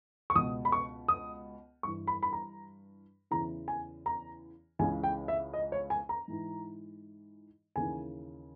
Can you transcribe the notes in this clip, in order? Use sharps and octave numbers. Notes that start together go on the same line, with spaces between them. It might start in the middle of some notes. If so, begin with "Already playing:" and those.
C#6
C#2 B2 D#6
B5
C#6
D#6
G2 E3 C#6
B5
B5
A#5
E2 C#3 E3 A#5
G#5
A#5
C#2 C#3 E3 G#5
G5
E5
D#5
C#5
G#5
A#5
G#2 E3
D#2 C#3 E3 G#5